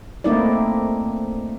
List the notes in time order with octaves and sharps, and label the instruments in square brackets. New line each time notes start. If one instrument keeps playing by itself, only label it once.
[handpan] A3 A#3 C4 D#4 E4 D5